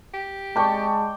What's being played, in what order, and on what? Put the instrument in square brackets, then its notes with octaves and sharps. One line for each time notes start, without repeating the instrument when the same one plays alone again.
[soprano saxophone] G4
[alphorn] G#3 [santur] D5 G5 [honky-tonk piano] A5 C#6